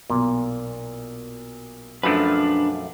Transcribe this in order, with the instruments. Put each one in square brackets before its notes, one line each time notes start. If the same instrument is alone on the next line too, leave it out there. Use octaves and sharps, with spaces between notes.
[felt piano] B1 [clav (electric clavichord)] A#2
[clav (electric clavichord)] F#2 F3 A3 [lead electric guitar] D4 B4